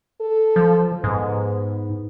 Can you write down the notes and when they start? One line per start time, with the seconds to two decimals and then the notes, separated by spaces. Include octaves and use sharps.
0.20 A4
0.56 F3
1.04 G#2 B3